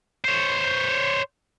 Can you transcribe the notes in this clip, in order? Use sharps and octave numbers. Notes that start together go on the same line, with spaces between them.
C5 C#5